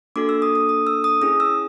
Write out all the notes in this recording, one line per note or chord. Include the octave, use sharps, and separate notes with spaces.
A#3 D4 F#4 A4 D6
E6
D#6
D#6
D#6
E6
D#6
C#4 E4 G#4 D#6
E6